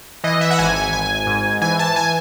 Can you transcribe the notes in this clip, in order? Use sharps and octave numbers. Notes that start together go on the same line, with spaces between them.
E3 D#5
E5
F#5
G#1 G#5
G#5
G#1 G#5
G#2
E3 G#5
A5
G#5